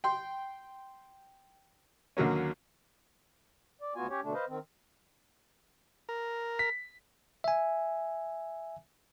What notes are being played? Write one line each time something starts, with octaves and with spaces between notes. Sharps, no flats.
G5 C6
D#2 D3 F#3 A#3 C#4
D5
D2 B3 F4 F#4 G#5
C#4 G4 C#5
B2 D3 A3 D4
B4 C5 D#5 F5
D#3 C4
A#4
B6
E5 G#5